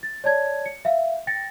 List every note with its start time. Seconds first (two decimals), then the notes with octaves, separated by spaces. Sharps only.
0.03 A6
0.24 C#5 D5 A5 G#6
0.66 C#7
0.85 E5 F5
1.27 G5 A6 A#6 C#7